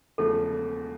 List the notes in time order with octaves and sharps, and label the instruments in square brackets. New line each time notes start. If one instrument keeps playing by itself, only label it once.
[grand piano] E1 E2 C#3 F3 A3 [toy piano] A4